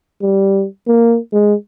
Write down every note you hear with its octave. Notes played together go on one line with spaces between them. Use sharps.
G3
A#3
G#3